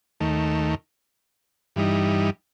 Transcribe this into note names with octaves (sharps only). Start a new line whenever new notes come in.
D#2 D#3 A3
G2 E3 G3 D#4